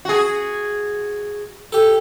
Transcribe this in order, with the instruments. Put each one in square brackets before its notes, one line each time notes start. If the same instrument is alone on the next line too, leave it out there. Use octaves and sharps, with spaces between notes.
[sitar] F#4 G#4
[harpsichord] G4 A4